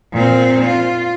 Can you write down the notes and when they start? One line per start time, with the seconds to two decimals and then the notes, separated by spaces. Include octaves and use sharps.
0.13 A#2 C4
0.64 F4